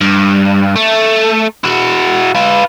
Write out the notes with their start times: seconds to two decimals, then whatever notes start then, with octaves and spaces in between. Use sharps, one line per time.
0.01 G2
0.76 A3
1.64 E4 F#4
2.35 F4 B4